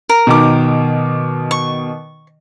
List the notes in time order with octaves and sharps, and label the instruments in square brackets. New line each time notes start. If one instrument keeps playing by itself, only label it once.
[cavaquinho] A#4
[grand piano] B2 D#3 D6
[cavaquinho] C#6